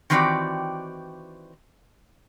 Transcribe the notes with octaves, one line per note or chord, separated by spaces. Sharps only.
D#3 E3 C4 F#4 G4 D5